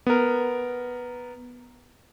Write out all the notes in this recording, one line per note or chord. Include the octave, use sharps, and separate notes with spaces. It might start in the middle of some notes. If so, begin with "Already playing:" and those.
B3 A#4